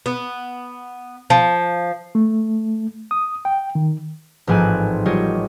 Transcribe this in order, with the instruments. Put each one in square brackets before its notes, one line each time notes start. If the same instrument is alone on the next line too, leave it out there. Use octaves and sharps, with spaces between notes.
[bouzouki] B3
F3
[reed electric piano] A3
D#6
G5
D#3
[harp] A1 G#2 F3 C4 G#5 F#6
F#3 G3 F4 G4 C#5 D#5